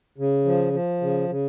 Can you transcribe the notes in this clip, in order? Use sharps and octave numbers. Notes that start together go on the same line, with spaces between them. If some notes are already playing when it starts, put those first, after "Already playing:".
C#3
F3
F3
C#3
C#3